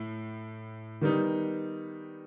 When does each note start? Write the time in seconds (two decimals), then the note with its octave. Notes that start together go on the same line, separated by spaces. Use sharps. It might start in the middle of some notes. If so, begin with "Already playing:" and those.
Already playing: A2
1.01 D#3 G3 B3 D#4